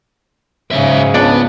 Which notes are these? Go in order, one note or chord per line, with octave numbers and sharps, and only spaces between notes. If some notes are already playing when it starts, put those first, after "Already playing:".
G#2 C#3 F#3 E5
C#2 B3 D4 D5